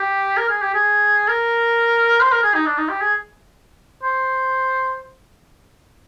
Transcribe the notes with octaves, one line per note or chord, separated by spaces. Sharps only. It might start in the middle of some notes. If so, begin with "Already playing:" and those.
Already playing: G4
A#4
G#4
G4
G#4
A#4
C5
A#4
G#4
D#4
D4
D#4
G4
G#4
C5